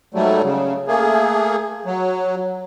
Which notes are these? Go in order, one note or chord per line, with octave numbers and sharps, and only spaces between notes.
G#2 F#3 G3 A3
C#3
A3 A#3 G#4
F#3